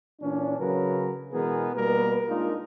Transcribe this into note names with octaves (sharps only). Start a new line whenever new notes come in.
A#2 E3 C#4 D4
C#3 F#3 F#4 A#4 B4
B2 E3 G#3 B3 G#4 A#4
B2 G3 A#3 A#4 B4
G#3 A#3 D4 D#4 F4